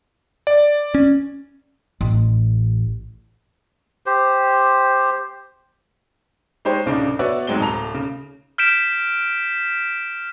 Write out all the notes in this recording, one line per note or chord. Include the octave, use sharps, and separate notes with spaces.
D5
C#4
A1
G4 C5
G#3 D#4 G4 C5 C#5
D1 C#3 D4 D#4
B3 F#4 C#5 D5 E5
F1 G#2 F#3 G#3 C4 G7
D1 A5 A#5 F7
C#3
F6 G6 B6 D7 E7